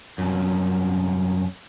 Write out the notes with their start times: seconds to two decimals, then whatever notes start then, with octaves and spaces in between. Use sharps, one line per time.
0.18 C2 F#2